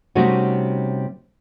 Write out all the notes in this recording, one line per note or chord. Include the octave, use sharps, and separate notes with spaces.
C3 G3 A3 C#4 D#4 F#4